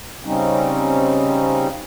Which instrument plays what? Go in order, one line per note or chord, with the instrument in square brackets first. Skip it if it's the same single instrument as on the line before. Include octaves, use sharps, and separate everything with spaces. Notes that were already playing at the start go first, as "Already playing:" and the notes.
[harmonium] C#3 G3 C4 C#4 D#4